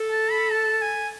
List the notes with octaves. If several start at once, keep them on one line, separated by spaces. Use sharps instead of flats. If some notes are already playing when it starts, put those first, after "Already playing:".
Already playing: A4
A5
B5
A5
G#5